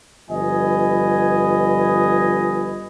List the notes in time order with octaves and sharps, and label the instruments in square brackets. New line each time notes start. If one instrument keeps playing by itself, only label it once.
[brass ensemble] G1 F3 B4 D#5 G#5